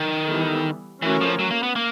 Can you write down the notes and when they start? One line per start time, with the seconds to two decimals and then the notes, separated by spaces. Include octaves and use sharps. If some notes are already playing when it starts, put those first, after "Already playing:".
Already playing: D#3
0.29 E3 G3 B3 E4 A4
1.02 E3 A3 C#4 F#4 A#4 C#5
1.21 F3
1.39 F#3
1.51 A#3
1.63 B3
1.76 A#3